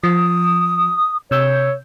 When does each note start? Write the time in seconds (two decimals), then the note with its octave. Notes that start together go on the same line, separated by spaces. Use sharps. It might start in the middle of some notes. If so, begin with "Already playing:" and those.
0.04 F3 D#6
1.31 C3 C#5 E6 G6